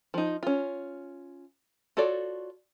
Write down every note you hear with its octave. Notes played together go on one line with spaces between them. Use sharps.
F3 D#4
C#4 F4
F4 F#4 A4 C#5 D5